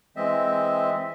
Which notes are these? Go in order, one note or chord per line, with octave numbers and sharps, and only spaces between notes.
E3 G#3 C4 D#5 E5